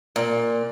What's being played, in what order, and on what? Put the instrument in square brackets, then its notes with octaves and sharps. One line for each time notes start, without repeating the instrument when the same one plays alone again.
[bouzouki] A#2